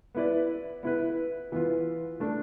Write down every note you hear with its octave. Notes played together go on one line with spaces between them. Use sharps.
B3 E4 B4 D5
B3 E4 B4
E3 B3 F4
A3 D4 A4